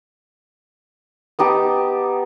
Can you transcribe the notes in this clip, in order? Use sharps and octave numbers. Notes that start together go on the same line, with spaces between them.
B3 D#4 G4 A5